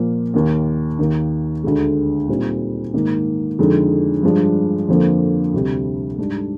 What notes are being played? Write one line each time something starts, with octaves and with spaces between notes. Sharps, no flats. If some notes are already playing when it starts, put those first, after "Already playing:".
Already playing: A#2 F3 A#3
D#2 D#3 A#3
D#2 D#3 A#3 D#4
D2 D3 G#3
A#2 G3 C4 D#4
G#2 D#3 A#3 D#4
F2 D3 G#3 D#4
G2 F3 G#3 D4
F2 D3 F3 A#3
D2 C3 G3
G#2 G3 D4